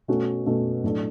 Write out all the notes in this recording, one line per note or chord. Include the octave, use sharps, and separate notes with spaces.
B2 A3 C#4 F#4
B2 A3 C#4
A2 F#3 A3 D4